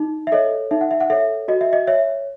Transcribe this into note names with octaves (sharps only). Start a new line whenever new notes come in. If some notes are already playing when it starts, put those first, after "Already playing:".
Already playing: D#4
E5
A4 C#5 D#5
D#4 E5
F#5
E5
F#5
A4 C#5 E5
F#4 D#5
E5
D#5
C#5 E5